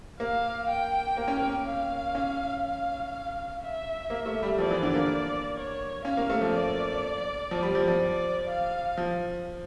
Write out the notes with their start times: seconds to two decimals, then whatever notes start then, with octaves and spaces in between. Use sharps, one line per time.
0.20 A#3 F5
0.68 G5
1.17 A#3
1.28 C#4
1.37 A#3
1.66 F5
2.15 C#4
2.64 F5
3.61 E5
4.10 A#3
4.26 A3
4.43 G3
4.58 F3 D5
4.71 E3
4.83 D3
4.95 A#3
5.56 C#5
6.05 C#4 F5
6.17 A#3
6.30 A3
6.41 F3
6.54 D5
7.51 F3
7.63 G3
7.75 F3
7.88 F3
8.00 D5
8.49 F5
8.97 F3